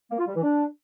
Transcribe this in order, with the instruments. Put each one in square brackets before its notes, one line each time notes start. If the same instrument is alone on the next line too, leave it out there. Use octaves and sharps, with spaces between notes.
[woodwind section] A#3
F4
G3
E3
D4